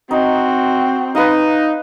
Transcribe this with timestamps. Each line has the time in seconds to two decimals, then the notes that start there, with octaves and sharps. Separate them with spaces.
0.11 C4 D#4 F#4
1.15 D#4 B4 F5